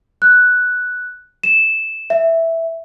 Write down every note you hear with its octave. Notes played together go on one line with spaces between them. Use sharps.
F#6
E7
E5